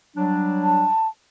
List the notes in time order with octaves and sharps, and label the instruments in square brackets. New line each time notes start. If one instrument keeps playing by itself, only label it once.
[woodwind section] F#3 G3 D4
[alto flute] A5